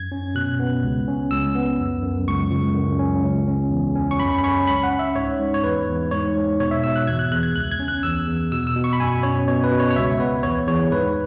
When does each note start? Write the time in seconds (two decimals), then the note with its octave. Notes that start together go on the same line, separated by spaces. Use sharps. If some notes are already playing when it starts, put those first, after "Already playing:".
Already playing: F#2 G#6
0.12 C#4
0.35 B2 F#6
0.59 B3
0.83 C#2
1.08 C#4
1.31 C#2 E6
1.55 B3
1.79 F#2
2.03 F#2
2.27 C#2 C#6
2.51 C#2
2.75 F#2
2.99 C#4
3.23 C#2
3.48 C#4
3.71 E2
3.95 C#4
4.11 C#6
4.20 F#2 B5
4.38 B5
4.43 C#4 C#6
4.67 C#2 B5
4.83 F#5
4.91 C#4
4.99 E5
5.15 G#2 C#5
5.39 G#2
5.54 C#5
5.64 E2 B4
5.88 E2
6.11 G#2 C#5
6.36 G#2
6.59 B2 C#5
6.71 E5
6.84 B2 E6
6.96 F#6
7.07 E2 G#6
7.19 F#6
7.32 E2 F#6
7.43 G#6
7.55 C#2 F#6
7.72 G#6
7.80 C#4
7.88 F#6
8.03 E2 E6
8.28 E2
8.52 B2 E6
8.67 E6
8.75 B2
8.84 C#6
8.93 B5
9.00 F#2 G#5
9.23 C#4 C#5
9.47 B2 C#5
9.64 B4
9.71 B2
9.80 C#5
9.91 C#5
9.96 C#2 E5
10.20 B3 B4
10.43 E2 C#5
10.68 E2 C#5
10.92 G#2 B4